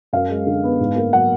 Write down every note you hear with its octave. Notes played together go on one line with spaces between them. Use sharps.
F#2 F5
G#3
D3
B3
G#2
A#3
F#3 F#5